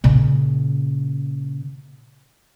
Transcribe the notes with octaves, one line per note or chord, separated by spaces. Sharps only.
A#2 C#3